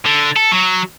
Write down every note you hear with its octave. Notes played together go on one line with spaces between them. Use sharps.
D3
A4
F#3